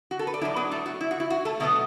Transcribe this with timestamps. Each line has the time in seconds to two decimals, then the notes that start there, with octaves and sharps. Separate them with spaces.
0.11 F#4
0.19 A4
0.27 B4
0.34 D5
0.41 A2 F#3 D4 E4 E5
0.56 B3 B4
0.71 A3 A4
0.86 F#4
1.01 E4
1.11 F#4
1.20 E4
1.30 F#4
1.45 A3 A4
1.60 B2 F#3 A3 B3 A4